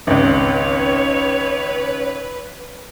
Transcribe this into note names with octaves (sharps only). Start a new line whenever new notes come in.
G#1 C#2 B4 C#5